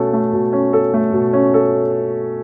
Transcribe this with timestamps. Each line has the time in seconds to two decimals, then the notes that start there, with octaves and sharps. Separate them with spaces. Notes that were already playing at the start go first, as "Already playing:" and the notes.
Already playing: B2 A3 C#4 A4
0.13 A3
0.33 B2
0.53 C#4
0.73 A4
0.94 A3
1.13 B2
1.33 C#4
1.54 A4